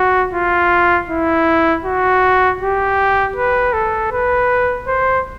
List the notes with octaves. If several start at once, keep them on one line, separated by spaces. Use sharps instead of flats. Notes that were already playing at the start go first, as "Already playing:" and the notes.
Already playing: F#4
F4
E4
F#4
G4
B4
A4
B4
C5